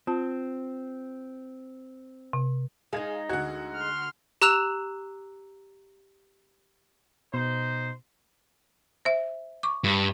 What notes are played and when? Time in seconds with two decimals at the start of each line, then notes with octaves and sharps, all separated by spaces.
0.07 C4 F4 A5
2.33 C3
2.93 G#3 D#4 G#4 F5 G#6
3.29 D2 F#4 F#5 G#6
3.75 C6 F6
4.42 G4 A#5 E6 F#6 E7 F7
7.34 B2 D#4 C5
9.05 C5 E5
9.63 C#6 D6
9.84 G2